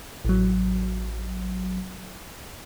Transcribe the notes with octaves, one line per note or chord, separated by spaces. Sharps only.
A1 F#3